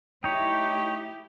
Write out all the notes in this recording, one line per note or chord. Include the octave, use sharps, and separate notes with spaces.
A3 D#4 E4 G4 C#5 G5